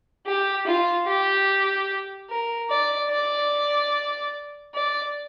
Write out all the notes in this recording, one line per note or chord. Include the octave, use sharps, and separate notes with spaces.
G4
F4
G4
A#4
D5
D5
D5